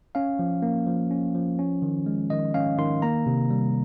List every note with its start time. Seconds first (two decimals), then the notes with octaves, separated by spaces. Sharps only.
0.15 C#4 F5
0.39 F3
0.62 A#3
0.87 F3
1.11 C#4
1.35 F3
1.59 C#4
1.82 D#3
2.06 G#3
2.30 D#3 D#5
2.54 C#4 F5
2.78 D#3 C6
3.02 A#3 A#5
3.26 C3
3.51 G3